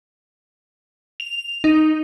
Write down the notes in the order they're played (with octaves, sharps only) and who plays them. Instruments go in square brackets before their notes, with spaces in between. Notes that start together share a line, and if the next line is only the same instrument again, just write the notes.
[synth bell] F7
D#4